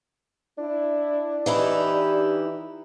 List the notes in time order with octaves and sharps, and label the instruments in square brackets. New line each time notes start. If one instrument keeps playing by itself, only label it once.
[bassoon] D4 [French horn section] E4
[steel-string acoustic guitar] E3 D#4 E4 [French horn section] G4